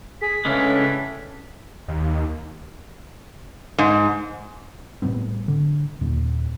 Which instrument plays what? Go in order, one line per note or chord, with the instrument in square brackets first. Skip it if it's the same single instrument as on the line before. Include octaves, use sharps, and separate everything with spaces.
[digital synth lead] G#4 [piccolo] B6
[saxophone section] A2 E3 A3 [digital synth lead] C#3 [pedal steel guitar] G#3 C#4 D4
[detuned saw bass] D#2
[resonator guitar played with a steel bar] G#2
[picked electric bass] A2 G3 B3 C4
D3
D#2 A#2